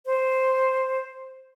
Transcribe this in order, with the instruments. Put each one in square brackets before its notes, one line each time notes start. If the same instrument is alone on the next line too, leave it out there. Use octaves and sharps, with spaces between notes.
[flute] C5